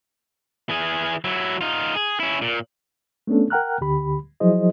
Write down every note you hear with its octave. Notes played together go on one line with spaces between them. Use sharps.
E3 G#4
F#3 E4
D#4 F4
G#4
C#4 E4
A#2
A3 B3 C#4 D4 A4
A#4 F#5 G5 A#5 F6 F#6
D2 D3 G4 B5
F3 F#3 E4 G#4 C5 D#5